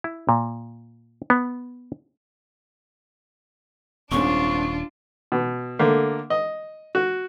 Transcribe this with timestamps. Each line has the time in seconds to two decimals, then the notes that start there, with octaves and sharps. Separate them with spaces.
0.04 E4
0.29 A#2
1.30 B3
4.11 D#1 C2 G#2 C#4 D4 F4 C#6
5.32 B2
5.79 D3 A3 A#3
6.30 D#5
6.95 F#4